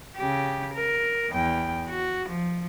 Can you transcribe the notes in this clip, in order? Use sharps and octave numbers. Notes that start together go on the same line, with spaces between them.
C#3 G4
A#4
E2 G5
F#4
F3